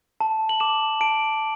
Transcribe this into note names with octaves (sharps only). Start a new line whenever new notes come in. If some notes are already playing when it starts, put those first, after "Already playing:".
A5
F#7
D6 E7
A5 D7